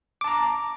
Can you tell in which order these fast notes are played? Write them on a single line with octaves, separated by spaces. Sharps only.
D6 A5 A#5